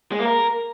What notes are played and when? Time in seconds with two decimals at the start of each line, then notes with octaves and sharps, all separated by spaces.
0.12 G#3
0.19 A#3
0.26 A#4